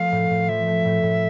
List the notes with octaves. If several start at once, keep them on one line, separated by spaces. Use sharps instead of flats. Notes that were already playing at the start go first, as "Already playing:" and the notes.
Already playing: F3 A3 F5
A2
A2
F3 E5
A3
A2
A2